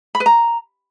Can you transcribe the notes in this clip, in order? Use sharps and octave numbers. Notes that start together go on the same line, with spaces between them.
B5
B4
A#5